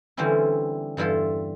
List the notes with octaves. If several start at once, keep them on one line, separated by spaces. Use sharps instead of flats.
D3 E3 G3 C4 C#4 E4
E2 G2 E4 F4 A4